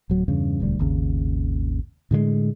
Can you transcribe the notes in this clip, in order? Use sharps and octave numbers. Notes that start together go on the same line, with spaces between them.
D1 F#3
E2 G2 C#3
E1 D2 G3
G#1 D#2 C#3
A2 D3 F3 G#3